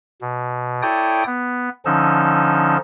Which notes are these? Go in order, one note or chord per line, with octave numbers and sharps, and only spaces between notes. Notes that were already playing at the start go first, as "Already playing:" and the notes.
B2
E4 A4 C#5 D5 G5 D#6
B3
D3 F3 C#4 D#4 E6